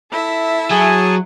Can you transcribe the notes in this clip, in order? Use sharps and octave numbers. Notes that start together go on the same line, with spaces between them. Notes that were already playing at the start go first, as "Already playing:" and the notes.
E4 A4 E5
F#3 G#4 G#5 A5